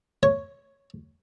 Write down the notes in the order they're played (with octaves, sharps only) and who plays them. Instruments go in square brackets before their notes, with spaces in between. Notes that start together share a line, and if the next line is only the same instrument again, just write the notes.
[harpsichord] C#5